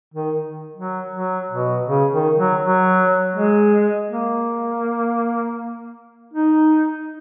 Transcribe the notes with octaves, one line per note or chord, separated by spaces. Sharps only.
D#3
F#3
F#3
B2
C#3
D#3
F#3
F#3
G#3
A#3
D#4